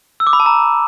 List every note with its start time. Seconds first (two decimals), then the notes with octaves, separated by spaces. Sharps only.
0.20 E6
0.27 D6
0.33 B5
0.40 A5
0.46 A#5